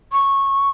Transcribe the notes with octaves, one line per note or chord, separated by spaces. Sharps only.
C#6